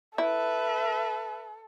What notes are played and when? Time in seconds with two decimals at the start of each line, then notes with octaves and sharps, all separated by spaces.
0.18 E4 A4 B4 E5